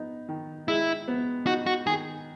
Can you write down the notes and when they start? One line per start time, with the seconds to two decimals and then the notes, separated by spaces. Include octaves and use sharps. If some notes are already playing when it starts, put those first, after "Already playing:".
Already playing: B3 D#4
0.29 D#3
0.68 G#3 E4
1.08 B3
1.47 D#4 F#4
1.66 F#4
1.87 D#3 G#4